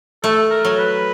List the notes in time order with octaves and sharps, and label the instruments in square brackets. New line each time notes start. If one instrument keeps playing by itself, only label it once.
[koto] A3 [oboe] A4
[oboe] A#4
[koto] F#3
[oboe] B4